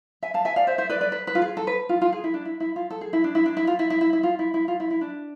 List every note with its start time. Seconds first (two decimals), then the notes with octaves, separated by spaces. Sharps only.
0.22 E5 G#5
0.34 F5 A5
0.45 E5 G#5
0.56 D5 F5
0.67 C5 E5
0.78 C5 E5
0.89 B4 D5
1.01 B4 D5
1.12 B4
1.27 B4
1.35 F4
1.42 G#4
1.57 A4
1.67 B4
1.89 F4
2.01 F4
2.13 G#4
2.24 E4
2.34 D4
2.45 E4
2.60 E4
2.76 F4
2.90 A4
3.01 G#4
3.13 E4
3.24 D4
3.35 E4
3.46 D4
3.57 E4
3.67 F4
3.79 E4
3.90 E4
4.01 E4
4.13 E4
4.23 F4
4.39 E4
4.54 E4
4.68 F4
4.80 E4
4.91 E4
5.01 D4